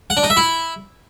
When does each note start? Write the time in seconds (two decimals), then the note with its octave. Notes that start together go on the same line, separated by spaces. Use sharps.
0.10 F#5
0.17 D4
0.23 D#4
0.30 E5
0.37 E4